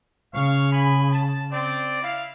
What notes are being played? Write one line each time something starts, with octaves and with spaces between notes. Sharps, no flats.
C#3 F5 C#6
G#5 B5
A5
C4 D5
E4 F5